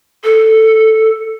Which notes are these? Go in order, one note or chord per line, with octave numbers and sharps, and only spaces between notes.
A4